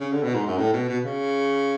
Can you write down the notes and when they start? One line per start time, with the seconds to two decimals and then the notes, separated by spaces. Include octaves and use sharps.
0.01 C#3
0.12 D3
0.23 B2
0.35 G#2
0.47 F#2
0.58 A2
0.73 B2
0.89 B2
1.05 C#3